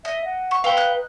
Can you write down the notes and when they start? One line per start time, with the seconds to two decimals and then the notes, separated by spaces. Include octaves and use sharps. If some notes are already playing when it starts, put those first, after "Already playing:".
0.05 D#5 E5
0.25 F#5
0.51 C#6
0.64 B4 C5 E5 F5 G5
0.77 D#4 F#6